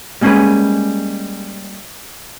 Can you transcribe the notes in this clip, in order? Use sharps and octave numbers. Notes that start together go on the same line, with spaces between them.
G3 G#3 A#3 C#4 G#4 B4